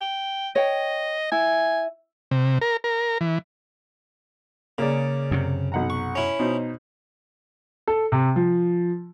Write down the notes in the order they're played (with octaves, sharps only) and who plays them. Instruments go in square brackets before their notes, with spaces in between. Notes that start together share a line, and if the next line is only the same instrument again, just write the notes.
[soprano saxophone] G5
[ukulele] C#5 G5 [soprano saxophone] D#5
[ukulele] E4 [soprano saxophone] G#5
[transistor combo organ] C3
A#4
A#4
E3
[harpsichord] C#3 [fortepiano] A#3 G#4 D5
[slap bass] F#2 C3
[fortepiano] B1 F#5 A#5
[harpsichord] C#6
C#4 E4
[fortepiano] B2 D#4 C5
[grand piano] A4
C3
F3